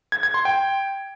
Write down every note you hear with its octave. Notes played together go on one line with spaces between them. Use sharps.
G#6
G#6
C6
G5